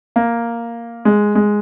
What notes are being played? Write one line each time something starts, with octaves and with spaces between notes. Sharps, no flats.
A#3
G#3
G#3